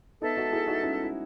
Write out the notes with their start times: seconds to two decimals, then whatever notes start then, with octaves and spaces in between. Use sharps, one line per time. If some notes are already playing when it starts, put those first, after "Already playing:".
0.22 B3 D#4 A4 E5 A5
0.37 D#4 F#4
0.53 E4 G#4
0.67 D#4 F#4
0.83 C#4 E4
1.04 E4